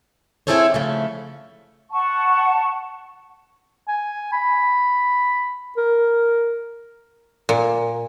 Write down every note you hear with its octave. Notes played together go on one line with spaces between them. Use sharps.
C4 E4 G#4 A4 C5 C#5
C#3 F3 A3
F#5 A5 C#6
G#5
B5
A#4
A#2